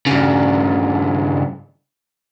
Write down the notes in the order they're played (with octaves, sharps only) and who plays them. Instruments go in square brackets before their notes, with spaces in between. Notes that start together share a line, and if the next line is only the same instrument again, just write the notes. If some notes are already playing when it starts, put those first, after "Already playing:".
[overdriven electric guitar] G2 C#3